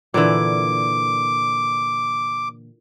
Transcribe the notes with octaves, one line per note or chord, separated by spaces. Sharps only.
A#2 D3 E3 D6